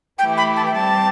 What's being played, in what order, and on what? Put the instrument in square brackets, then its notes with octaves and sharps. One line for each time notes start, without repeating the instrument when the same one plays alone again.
[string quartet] E3 A3 E4 G4 [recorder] G5
[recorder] B5
A5
G5
[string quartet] G3 C4 G4 [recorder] A5